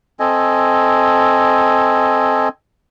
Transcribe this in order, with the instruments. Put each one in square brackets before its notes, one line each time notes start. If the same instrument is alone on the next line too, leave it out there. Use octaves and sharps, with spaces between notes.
[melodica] C4 A4 D#5 G#5